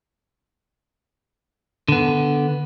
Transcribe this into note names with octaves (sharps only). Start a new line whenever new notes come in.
D3 B3